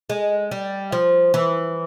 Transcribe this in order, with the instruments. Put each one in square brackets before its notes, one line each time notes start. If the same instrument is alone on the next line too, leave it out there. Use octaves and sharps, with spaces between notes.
[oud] G#3
G3
F3
E3